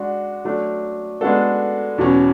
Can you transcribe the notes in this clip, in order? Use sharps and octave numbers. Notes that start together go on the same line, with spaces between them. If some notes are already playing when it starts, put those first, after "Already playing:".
Already playing: G#3 D4 F#4 D5
F#3 A3 D4
G#3 B3 D4 F#4 A4
E2 B2 F#3 C#4